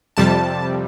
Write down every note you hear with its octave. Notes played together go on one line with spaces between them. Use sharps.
F2 C3 G3 A5